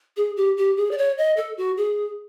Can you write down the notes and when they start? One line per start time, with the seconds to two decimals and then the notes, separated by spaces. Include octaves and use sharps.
0.17 G#4
0.37 G4
0.57 G4
0.77 G#4
0.91 D5
0.98 C#5
1.18 D#5
1.37 A4
1.57 F#4
1.77 G#4